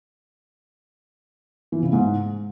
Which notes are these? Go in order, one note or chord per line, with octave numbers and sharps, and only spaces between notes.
E3
C#3
G#2